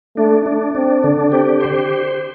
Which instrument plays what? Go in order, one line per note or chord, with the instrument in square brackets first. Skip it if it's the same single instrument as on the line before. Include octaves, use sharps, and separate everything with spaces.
[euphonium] A3 [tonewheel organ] D4
[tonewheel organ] D4
[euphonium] C4 [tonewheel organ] D4
[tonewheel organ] D3
[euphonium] C4 [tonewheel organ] G4
[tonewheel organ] C5